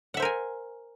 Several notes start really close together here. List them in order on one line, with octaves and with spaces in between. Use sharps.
F#5 E5 C5 A#4 G#5